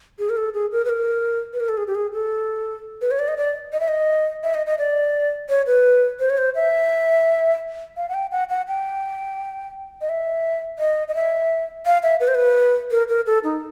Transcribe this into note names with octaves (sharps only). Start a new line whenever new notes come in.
G#4
A#4
A4
G#4
A#4
B4
A#4
B4
A#4
A4
G#4
G4
G#4
A4
B4
C#5
D5
D#5
D5
D#5
E5
D#5
E5
D#5
D#5
D5
C#5
B4
C5
C#5
C5
E5
F5
F#5
G5
F#5
F#5
G5
D#5
E5
D#5
D#5
E5
F5
E5
B4
C5
B4
A#4
A#4
A4
D#4